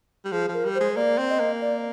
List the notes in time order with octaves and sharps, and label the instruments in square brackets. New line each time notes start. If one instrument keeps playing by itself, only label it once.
[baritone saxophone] G3
[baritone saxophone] F3 [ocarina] G#4
[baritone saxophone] F3 [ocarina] A#4
[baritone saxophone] G3
[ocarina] C5
[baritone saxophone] G#3
[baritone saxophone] A#3 [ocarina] D5
[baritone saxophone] C4
[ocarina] D#5
[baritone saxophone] A#3
[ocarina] D5